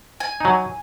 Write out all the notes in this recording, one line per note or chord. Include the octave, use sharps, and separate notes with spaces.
G#5
F#3 D#4